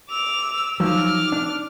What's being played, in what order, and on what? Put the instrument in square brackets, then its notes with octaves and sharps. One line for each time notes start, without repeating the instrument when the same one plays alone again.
[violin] D6 F7 [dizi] E6
[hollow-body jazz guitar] F3 F#3 [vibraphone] D#4 [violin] D6 F6
[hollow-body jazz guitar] D4